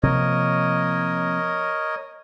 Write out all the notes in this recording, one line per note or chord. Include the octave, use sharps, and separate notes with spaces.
C3 F3 A#3 A#4 C#5 D#5